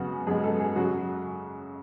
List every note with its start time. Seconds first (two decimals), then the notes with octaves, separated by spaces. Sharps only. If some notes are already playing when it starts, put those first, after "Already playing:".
Already playing: F#2 C#3 G#3 B3 F#4
0.27 F#2 C#3 G#3 B3 G#4
0.44 A4
0.60 G#4
0.76 F#2 C#3 F#3 F#4